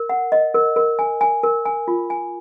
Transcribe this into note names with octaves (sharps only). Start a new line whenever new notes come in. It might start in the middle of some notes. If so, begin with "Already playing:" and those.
Already playing: A#4
F#5
D#5
A#4
A#4
G#5
G#5
A#4
G#5
F4
G#5